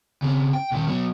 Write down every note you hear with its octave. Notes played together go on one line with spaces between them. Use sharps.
C#3 C4
G5
A#2 D#3
F#3 B3